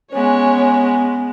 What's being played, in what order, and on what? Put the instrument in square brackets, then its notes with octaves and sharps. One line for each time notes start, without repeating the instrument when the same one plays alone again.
[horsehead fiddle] G#3 B3 [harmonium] C#4 [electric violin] C#5